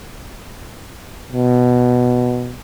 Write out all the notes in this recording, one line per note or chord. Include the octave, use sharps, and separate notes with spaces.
B2